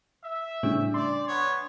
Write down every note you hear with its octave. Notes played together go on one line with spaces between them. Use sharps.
E5
A2 C#3 G3 D4
D5 C6
B3 C#5